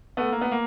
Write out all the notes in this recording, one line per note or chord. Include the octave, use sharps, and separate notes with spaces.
A3 B3
A#3
B3
A#3